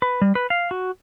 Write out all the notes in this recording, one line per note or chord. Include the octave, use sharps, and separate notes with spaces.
B4
G3
B4
F5
F#4